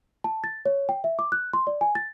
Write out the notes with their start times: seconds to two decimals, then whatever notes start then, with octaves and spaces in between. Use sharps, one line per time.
0.24 A5
0.44 A6
0.65 C#5
0.89 G5
1.04 E5
1.19 D6
1.32 F#6
1.53 C6
1.67 D5
1.81 G#5
1.95 A6